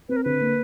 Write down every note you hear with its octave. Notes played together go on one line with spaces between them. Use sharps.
C4 B4
A#4
D3 B4
A#3